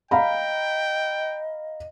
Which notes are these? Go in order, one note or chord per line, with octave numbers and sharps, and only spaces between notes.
D#5 F5 G5 A#5 B5